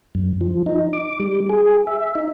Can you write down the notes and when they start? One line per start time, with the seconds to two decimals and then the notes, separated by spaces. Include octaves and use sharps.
0.15 F#2
0.41 F3
0.66 D#4
0.93 D6
1.20 G3
1.49 G#4
1.87 E5
2.15 D#4